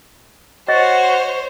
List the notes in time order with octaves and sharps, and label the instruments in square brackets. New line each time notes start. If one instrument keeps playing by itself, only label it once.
[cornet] F#4 [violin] C5 C#5 [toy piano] D#5